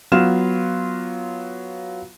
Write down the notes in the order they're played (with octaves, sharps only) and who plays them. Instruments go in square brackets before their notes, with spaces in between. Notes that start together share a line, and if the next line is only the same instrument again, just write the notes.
[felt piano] F#3 B3 F4 C6 F6 E7